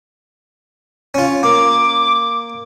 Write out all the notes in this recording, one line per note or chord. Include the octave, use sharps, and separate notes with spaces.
C#4 F4
A#3 D6